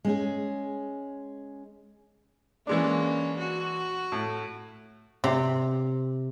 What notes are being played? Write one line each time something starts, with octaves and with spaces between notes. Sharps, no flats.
G#3 C#4 G#4
E3 G#3 A#3 C#4 D4
F#4
A2
C3